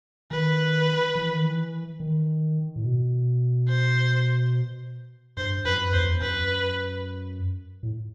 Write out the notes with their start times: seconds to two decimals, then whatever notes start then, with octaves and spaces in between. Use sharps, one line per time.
0.31 D#3 B4
1.15 E3
1.29 D#3
1.44 E3
2.00 D#3
2.76 A2
2.84 B2
3.68 C5
5.37 G2 C5
5.65 F#2 B4
5.93 E2 C5
6.00 F#2
6.08 E2
6.21 F#2 B4
7.83 A2